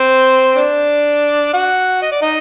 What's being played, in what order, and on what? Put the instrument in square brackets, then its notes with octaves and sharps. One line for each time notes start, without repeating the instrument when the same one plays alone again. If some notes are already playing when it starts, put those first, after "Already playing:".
Already playing: [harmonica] C4 C5
D4 D5
F#4 F#5
D#5
D5
D#4 D#5